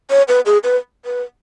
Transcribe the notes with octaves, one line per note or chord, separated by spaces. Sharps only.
C#5
B4
G#4
B4
B4